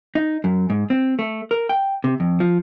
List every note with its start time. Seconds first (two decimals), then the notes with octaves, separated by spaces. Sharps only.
0.15 D#4
0.44 F#2
0.70 G#2
0.90 C4
1.19 A3
1.51 A#4
1.69 G5
2.04 C3
2.20 F2
2.40 F3